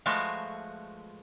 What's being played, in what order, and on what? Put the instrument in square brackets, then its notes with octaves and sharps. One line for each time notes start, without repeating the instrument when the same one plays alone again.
[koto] F3 G#3 A3 F4 F#4 B4